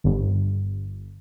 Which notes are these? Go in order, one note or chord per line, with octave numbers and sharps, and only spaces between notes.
G1